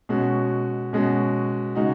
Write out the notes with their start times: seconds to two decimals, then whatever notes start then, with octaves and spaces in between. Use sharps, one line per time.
0.09 B2 G#3 C#4 F#4
0.93 B2 G#3 C#4 F#4
1.75 C#3 G#3 D#4 F#4